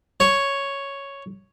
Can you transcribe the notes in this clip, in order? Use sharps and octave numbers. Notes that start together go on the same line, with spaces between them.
C#5